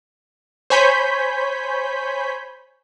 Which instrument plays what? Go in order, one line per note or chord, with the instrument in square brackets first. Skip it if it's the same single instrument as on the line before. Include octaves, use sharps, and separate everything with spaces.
[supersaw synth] C5 C#5 G#5 B5 G6 B6